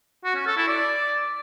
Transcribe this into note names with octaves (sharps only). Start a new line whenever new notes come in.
F#4
C#4
A4
E4
D5